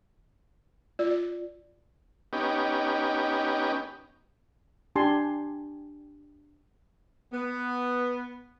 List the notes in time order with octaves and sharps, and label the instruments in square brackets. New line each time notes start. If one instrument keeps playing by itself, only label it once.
[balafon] F4 [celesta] D5
[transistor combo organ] B3 C#4 D#4 G4
[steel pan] D4 G4 G#5 A5 C6
[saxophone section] B3